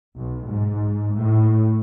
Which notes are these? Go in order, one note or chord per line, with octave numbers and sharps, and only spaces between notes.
B1
G#2
A2